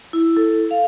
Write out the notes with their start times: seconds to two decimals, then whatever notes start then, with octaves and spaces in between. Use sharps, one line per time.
0.13 E4
0.37 A4
0.71 F5